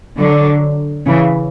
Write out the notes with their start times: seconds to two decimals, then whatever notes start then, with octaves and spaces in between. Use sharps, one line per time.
0.19 D3 F#3
1.06 C#3 E3